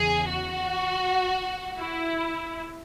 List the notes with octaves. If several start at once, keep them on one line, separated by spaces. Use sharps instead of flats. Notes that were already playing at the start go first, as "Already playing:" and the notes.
Already playing: E2 C#3 E3 G#4
F#4
E4